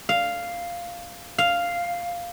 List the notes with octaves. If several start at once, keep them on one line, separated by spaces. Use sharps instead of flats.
F5
F5